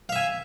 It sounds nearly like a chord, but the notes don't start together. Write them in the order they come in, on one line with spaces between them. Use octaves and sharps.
F5 E5 G#5